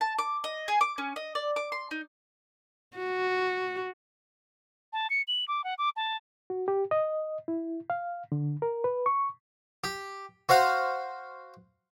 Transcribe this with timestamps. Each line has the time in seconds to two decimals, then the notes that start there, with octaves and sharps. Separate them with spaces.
0.01 A5
0.19 D6
0.44 D#5
0.68 G#4
0.81 D6
0.98 C#4
1.16 D#5
1.35 D5
1.56 D6
1.72 C6
1.91 D#4
2.97 F#4
4.93 A5
5.10 C#7
5.28 F#7
5.48 D6
5.64 F#5
5.78 D6
5.96 A5
6.50 F#4
6.68 G4
6.91 D#5
7.48 E4
7.90 F5
8.32 D3
8.62 A#4
8.84 B4
9.06 C#6
9.84 G4
10.49 F#4 C5 F5 F#5